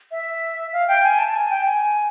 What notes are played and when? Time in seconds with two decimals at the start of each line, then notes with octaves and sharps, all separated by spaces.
0.11 E5
0.73 F5
0.88 G5
1.04 G#5
1.19 A5
1.34 G#5
1.50 G5
1.65 G#5